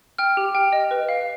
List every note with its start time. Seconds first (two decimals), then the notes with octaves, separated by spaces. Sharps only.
0.18 G5 F6
0.37 G4
0.55 G5
0.73 D#5
0.91 B4
1.09 F5